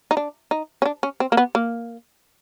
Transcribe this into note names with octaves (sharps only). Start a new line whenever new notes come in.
D#4
D4
D#4
C#4
D4
C#4
C4
A#3
B3
A#3